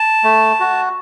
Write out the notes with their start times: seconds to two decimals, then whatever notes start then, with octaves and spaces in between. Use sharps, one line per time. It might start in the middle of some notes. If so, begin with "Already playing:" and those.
Already playing: A5
0.24 A3
0.60 F#4